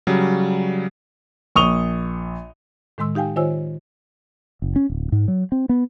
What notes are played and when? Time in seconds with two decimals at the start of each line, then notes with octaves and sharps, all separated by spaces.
0.07 C#3 F#3 G3
1.56 A#1 C#6 D#6 F7 G7
2.98 A2 D#3 G#3 C6 E6
3.15 D#4 G4 F5 G5 G#5
3.36 D#3 F4 C5 C#5 G#5 E6
4.62 F#1
4.76 C#4
4.90 D1
5.12 G#2
5.28 F#3
5.52 C4
5.69 B3